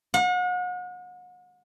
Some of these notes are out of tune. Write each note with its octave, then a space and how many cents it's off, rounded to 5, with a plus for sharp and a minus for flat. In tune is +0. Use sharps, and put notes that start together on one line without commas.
F#5 -40